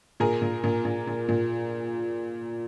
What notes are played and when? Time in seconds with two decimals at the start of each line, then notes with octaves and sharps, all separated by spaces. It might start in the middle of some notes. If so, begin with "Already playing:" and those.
0.20 A#2 G#4 A#4
0.42 A#2
0.64 A#2
0.85 A#2
1.07 A#2
1.29 A#2